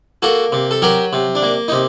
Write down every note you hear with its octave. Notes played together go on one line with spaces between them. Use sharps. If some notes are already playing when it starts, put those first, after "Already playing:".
A#3 F#4 A4
C3
A4
F#3 G4 A#4
C3
D4
A#3
C3 D#4